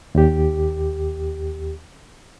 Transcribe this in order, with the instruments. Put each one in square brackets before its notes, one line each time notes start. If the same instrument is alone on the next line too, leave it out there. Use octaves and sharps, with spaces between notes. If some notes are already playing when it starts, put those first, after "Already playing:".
[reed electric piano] D#2 G4